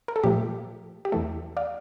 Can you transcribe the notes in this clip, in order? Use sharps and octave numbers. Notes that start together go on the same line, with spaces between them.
A#4
A4
A#2 F3 A3 G4
G4
E2 E3 A3 A4
D5 F5